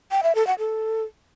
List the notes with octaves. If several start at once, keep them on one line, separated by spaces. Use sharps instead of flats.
G5
E5
A4
F#5
A4